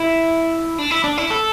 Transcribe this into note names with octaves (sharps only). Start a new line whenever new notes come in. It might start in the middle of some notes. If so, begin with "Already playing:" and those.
Already playing: E4
D4
E4
D4
E4
A4